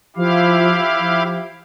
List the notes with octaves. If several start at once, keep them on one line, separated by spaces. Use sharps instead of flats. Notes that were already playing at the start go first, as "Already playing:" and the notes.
F3 E4 G4 F5
F3